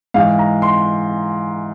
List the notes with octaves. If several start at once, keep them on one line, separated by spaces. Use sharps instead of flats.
G#2 E3 F5
A#5
C6